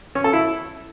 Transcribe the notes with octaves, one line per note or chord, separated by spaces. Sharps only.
C#4
A4
E4